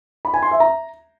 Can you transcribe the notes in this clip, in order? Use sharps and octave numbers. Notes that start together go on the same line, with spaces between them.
B5
G#5
C6
E5
A#5